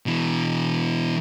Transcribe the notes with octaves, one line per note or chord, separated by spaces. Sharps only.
B2 E3